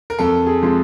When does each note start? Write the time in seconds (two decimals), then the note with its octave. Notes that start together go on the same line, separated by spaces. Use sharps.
0.10 A#4
0.19 F2 A4
0.47 G#4
0.62 C3 F3 G#3